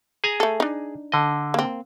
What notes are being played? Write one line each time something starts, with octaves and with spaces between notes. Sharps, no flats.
G#4 G#5 A#5
A3 A4
D4 D#4
D3 D#5
A#3 C4